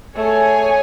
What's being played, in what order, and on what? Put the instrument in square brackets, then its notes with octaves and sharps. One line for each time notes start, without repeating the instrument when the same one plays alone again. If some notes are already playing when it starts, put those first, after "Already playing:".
[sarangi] A3 [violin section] G#4 C#5 G#5